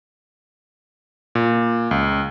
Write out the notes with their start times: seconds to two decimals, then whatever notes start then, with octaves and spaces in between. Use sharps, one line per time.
1.35 A#2
1.91 C#2